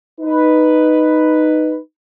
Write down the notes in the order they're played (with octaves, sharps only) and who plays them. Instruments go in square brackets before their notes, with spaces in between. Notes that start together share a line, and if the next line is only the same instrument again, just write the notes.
[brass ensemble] D#4 B4